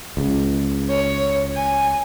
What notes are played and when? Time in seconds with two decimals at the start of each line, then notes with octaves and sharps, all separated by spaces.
0.17 C#2
0.89 C#5
1.54 G#5